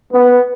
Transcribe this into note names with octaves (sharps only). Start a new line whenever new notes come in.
B3